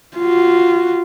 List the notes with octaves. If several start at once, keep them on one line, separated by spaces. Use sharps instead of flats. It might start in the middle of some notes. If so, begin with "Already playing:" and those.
F4 F#4